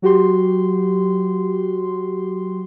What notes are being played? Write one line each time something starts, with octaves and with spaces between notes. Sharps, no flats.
F#3 F#4 G4 C6